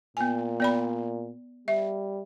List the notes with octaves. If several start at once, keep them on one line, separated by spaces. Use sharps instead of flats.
A#2 B3 G#5
B3 D5 B5
G3 E5